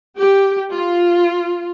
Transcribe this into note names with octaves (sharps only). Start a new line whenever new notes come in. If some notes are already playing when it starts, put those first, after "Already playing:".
G4
F4